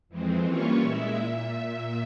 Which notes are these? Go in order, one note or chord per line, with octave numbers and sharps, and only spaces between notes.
F2 E3 G#3 C4
E3 G3 A#3 C#4 F4 C#5
A#2 G#3 E4 E5
A#2 E5